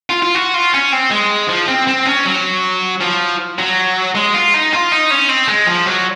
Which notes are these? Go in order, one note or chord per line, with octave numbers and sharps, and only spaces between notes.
F4
F4
F#4
F4
C#4
C4
G#3
F3
C4
C4
C#4
F#3
F3
F#3
G#3
F4
D#4
F4
D#4
C#4
C4
G#3
F3
F#3